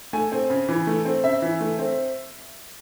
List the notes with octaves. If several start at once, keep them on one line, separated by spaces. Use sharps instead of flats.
A3 G#5
C4
C#3
E3
A3
C4
C#3 E5
E3
A3
C4